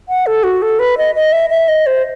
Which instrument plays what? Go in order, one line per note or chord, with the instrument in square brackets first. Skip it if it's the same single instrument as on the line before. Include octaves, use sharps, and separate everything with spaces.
[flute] F#5
A4
F#4
A4
B4
D#5
D#5
E5
E5
D#5
C5